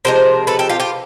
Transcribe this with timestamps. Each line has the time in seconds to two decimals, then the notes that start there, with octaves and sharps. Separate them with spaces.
0.05 C3 F3 G#3 A#4 C5
0.47 A4 B4
0.59 G4 A4
0.69 F4 G4
0.80 F4 G4